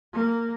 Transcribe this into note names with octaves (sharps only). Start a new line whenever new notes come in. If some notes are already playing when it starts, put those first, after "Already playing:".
A#3